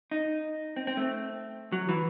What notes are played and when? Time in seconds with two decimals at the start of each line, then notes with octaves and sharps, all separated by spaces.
0.11 D#4
0.76 C4
0.87 C4
0.97 A3
1.72 F#3
1.89 E3